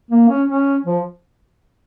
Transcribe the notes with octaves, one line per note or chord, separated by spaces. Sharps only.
A#3
C#4
C#4
F3